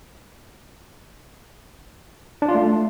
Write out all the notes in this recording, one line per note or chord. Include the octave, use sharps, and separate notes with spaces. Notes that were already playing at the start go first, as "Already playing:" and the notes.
D4
F4
A3